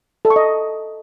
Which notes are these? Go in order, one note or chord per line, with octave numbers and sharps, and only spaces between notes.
A4
C#6
D#5